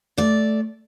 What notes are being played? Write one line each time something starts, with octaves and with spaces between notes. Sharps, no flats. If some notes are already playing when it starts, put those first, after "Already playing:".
A3 D5